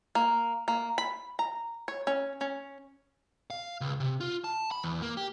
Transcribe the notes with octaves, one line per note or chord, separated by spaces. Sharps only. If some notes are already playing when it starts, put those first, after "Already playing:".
A#3
A#3
B5
A#5
C#5
C#4
C#4
F5
C#2
C3
F4
A5
B5
E2
A#3
G4